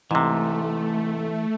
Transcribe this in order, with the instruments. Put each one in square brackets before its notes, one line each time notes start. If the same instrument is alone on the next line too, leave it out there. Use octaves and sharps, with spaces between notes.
[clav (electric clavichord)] G#2 C3 [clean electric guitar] E3 [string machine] A3